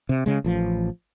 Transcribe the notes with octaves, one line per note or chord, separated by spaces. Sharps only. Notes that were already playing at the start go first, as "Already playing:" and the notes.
C3
C#3 G#3
A1 F3